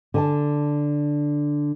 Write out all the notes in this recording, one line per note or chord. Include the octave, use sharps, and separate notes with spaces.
D3 G#5 A5